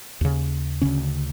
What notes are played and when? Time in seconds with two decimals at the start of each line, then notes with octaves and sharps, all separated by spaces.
0.21 D#2 C#3
0.81 D2 C#3 C#4